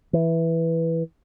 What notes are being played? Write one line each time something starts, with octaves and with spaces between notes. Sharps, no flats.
E3